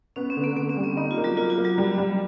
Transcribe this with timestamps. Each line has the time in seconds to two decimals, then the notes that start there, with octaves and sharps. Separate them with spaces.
0.16 B3 C#4
0.30 C4
0.37 D3
0.44 A#3
0.56 D3 A#3
0.70 C4
0.77 G3
0.84 B3
0.97 B3 D#4
1.11 F4
1.17 A#3
1.24 F#3 F#4
1.37 A#3 F4
1.50 F4
1.58 A#3
1.64 F#3 F#4
1.78 G3
1.98 G3